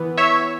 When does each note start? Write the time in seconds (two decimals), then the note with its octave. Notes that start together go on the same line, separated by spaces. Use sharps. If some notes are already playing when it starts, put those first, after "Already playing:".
Already playing: E3 B3
0.17 C#5 E5